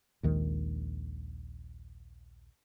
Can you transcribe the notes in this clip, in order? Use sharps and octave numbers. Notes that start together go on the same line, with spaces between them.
A#1 D#2 D#3 G#3